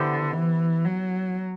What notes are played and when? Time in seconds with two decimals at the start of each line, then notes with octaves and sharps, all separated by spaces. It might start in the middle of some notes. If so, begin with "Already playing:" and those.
Already playing: D3 B3 E4 G4 C5
0.32 E3
0.85 F#3